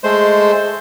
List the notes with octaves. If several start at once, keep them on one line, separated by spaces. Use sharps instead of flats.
G#3 A3 C5